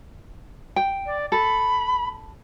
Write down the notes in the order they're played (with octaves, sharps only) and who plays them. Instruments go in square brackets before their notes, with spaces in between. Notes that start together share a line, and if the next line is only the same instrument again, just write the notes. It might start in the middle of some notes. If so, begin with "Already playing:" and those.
[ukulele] G5
[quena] D5
[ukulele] A4 [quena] B5